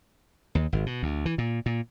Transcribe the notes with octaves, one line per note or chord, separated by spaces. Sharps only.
D#2
G#1
B2
D2
E3
A#2
A#2